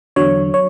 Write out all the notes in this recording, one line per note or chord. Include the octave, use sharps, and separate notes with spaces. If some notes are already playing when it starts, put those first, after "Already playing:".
E2 D3 F#3 C#5
F#3 C#5